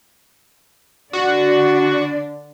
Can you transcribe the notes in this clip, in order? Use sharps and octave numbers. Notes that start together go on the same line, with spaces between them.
D3 D4 F#4 D5